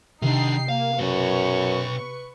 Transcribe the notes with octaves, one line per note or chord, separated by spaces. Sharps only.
C3 D#3 D4 D#4 G5 C7
A#3 F5
F#2 B2 B4 C#5 C#6